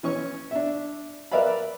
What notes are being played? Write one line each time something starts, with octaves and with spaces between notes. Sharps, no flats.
E3 C#4 C#6
D4 E5
A#4 B4 D5 E5 F5 B5